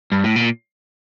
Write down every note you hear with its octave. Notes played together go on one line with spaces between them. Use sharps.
G2
A2
A#2